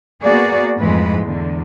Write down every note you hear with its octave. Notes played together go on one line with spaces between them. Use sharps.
A#3 B3 F#4 G#4 D5
F2 G#2 E3 G#3 A3 B4
E2 D3